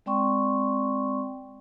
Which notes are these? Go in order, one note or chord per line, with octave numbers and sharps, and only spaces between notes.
G#3 C4 D5 G5 C6 C#6